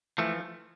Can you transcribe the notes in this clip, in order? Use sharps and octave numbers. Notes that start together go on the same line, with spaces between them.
E3 F3 A3